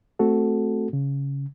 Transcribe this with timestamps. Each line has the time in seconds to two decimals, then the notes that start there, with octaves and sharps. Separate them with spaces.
0.19 A3 C4 F#4 A4
0.93 C#3